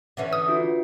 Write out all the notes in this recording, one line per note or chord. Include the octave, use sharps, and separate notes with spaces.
D3 E3 C#4
D#6
D4 F4 F#4